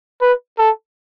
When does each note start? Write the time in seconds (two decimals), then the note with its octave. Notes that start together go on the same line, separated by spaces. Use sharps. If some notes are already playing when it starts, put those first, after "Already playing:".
0.21 B4
0.58 A4